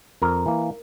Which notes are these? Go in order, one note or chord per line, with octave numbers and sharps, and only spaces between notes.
F2 A#4
E3 A#3